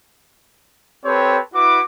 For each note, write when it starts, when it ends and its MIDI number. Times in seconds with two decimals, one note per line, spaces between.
1.05 1.39 60
1.05 1.39 67
1.05 1.39 69
1.05 1.39 71
1.05 1.39 73
1.54 1.81 64
1.54 1.81 66
1.54 1.81 71
1.54 1.81 86